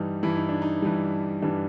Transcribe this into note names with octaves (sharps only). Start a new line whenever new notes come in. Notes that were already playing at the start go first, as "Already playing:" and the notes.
Already playing: G2 E3 G3 D#4
G2 E3 G3 E4
D#4
D4
D#4
G2 E3 G3
G2 E3 G3 D4